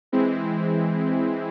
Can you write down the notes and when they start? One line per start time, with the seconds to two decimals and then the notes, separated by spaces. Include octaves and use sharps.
0.12 E3 G#3 C4 E4